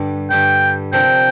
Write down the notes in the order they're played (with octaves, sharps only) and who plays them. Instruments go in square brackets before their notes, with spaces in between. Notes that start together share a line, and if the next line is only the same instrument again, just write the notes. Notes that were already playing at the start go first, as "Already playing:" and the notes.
Already playing: [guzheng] G2 D3 G3
[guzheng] G2 D3 G3 [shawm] G5
[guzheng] C3 F3 D4 A#4 [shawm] G5